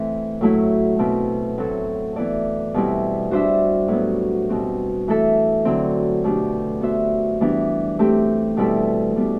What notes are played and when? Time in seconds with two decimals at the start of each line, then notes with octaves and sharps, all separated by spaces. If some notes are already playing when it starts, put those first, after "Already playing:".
Already playing: E3 A3 C4
0.41 A2 F#3 A3 E4
0.99 B2 A3 C4
1.58 A2 F#3 C4 F#4 A4
2.16 E3 B3 E4 A4 D5
2.74 B2 G3 C4 E4
3.31 G3 D4 F#4 C5 E5
3.88 A2 F#3 B3
4.49 B2 G3 C4 F#4
5.08 E3 A3 E4 A4 E5
5.65 D3 F#3 C4
6.24 B2 A3 D4 G4
6.81 B3 F#4 C5 E5
7.41 E3 G3 B3 D4
7.99 A3 C4 G4
8.57 B2 G3 C4 E4 A4
9.16 B2 G3 B3 D4